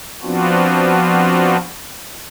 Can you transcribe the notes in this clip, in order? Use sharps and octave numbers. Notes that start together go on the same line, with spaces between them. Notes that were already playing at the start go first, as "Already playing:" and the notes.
F3 B3 C4 D4 F4 F#4